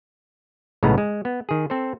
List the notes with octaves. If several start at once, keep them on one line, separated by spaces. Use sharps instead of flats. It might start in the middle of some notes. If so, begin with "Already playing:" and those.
B1 A2 C#3 G#3 B3 A#5
G#3
B3
D#3 G#4
C4 A4 C5